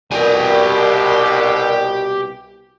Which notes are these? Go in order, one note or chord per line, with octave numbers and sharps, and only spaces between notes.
C2 B2 G4 A#4 D5 G#5